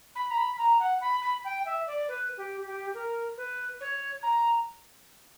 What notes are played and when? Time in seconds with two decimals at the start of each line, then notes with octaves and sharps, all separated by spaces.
0.15 B5
0.31 A#5
0.37 B5
0.58 A#5
0.79 F#5
1.01 B5
1.22 B5
1.44 G5
1.65 E5
1.87 D5
2.08 B4
2.37 G4
2.66 G4
2.94 A#4
3.37 B4
3.80 C#5
4.23 A#5